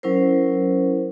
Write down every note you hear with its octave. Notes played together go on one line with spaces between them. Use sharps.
F#3 C#4 E4 A#4 C5